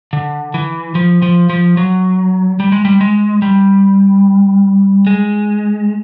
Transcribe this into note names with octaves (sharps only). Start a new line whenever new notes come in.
D3
E3
F3
F3
F3
F#3
G3
G#3
G3
G#3
G3
G#3